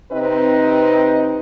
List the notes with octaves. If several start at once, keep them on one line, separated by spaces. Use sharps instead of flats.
C3 C4 D#4 B4 D#5